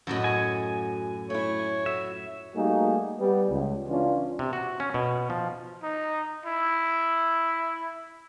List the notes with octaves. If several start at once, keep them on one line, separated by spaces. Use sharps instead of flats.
F#2 A2 F#4 D#5 F#5
G#5
A3 E4 C#5
F#4 E5
G3 A3 A#3 D#4 F#4 G#4
G3 B3
C#2
E3 C#4 D4 F4
C3
F#4
C#4
B2
F3
D#4
E4